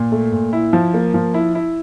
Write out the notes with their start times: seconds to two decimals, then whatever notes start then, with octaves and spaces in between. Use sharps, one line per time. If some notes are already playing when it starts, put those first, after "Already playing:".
Already playing: A#2
0.12 A3
0.32 A#2
0.53 E4
0.73 F3
0.94 A#3
1.14 F3
1.34 E4
1.55 E4